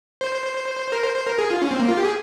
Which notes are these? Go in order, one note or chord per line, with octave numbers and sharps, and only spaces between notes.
C5
A#4
C5
C5
A#4
G#4
F4
C#4
C4
A#3
F4
G4
G#4